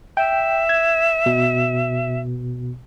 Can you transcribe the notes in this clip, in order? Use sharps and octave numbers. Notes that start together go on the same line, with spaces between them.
E5 G5
G#6
B2